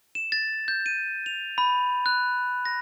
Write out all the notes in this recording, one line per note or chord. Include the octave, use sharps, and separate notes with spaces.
E7
A6
G6
D#7
F7
B5
F#6
A#6